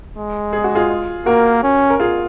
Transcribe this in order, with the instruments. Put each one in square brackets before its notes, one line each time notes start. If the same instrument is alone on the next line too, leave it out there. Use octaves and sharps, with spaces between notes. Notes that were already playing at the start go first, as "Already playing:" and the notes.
[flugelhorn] G#3
[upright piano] G#4
F#4
F4 G#4
[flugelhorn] A#3 [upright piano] F#4 A#4
[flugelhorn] C#4
[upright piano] A#4
F4 G#4